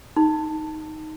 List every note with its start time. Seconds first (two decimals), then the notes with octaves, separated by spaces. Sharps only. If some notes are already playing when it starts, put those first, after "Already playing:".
0.17 D#4